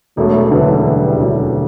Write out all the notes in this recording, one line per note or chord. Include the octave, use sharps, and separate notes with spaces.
E1 F#3 A3
D2 D3 E3 F#3 G3 C#4
E1 E3 G3
D2 D3 F#3 C#4